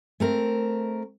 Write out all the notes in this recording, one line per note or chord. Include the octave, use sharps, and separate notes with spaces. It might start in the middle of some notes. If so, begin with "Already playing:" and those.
A3 C4 A#4